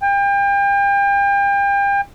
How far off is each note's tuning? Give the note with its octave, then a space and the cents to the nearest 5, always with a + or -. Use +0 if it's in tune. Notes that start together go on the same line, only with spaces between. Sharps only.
G5 +35